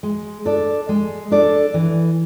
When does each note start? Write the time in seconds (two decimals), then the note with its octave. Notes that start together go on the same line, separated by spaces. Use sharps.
0.03 G#3
0.45 D4 A4 D5
0.89 G#3
1.31 D4 A4 D5
1.74 E3